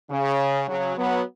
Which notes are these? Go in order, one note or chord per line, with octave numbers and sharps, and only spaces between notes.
C#3
C#3 F#3
F#3 B3